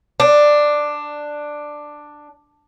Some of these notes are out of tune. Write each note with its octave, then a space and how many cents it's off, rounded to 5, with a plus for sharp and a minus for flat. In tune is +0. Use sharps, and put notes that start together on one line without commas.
D4 +10